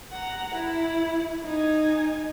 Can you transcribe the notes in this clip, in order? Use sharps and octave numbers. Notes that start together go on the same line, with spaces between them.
F#5 A#5
E4
D#4 G#5